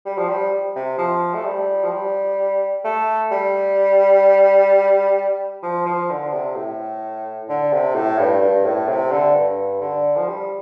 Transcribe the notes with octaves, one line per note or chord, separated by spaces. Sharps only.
G3
F3
G3
C3
F3
A3
G3
F3
G3
A3
G3
F3
F3
D3
C3
A2
D3
C3
A2
G2
G2
A2
C3
D3
G2
D3
F3
G3